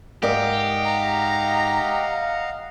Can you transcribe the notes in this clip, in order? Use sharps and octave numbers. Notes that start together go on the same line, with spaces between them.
G#2 G4 A#4 D5 D#5 F5 F#5
A#5